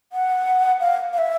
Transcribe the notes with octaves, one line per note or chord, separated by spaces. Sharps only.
F#5
F5
F5
E5